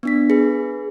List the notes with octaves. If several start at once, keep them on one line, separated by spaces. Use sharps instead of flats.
B3 D4 B6
G#4 B4